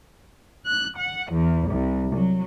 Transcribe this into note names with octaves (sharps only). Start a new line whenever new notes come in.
F#6
F#5
E2
C2
F#3